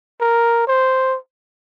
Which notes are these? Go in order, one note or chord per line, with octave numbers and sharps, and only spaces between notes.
A#4
C5